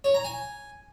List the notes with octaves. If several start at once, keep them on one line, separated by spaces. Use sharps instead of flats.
C#5
A#5
G#5